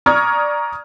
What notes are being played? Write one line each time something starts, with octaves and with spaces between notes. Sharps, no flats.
D5 A#5 C#6 D#6 F6 G#6